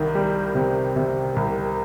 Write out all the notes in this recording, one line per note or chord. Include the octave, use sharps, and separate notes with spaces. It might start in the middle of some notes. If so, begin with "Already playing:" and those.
Already playing: C2 D#3
G3
C3
C3
C2